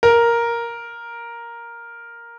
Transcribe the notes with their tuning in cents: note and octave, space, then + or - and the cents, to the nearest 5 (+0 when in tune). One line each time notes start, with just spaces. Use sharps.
A#4 +5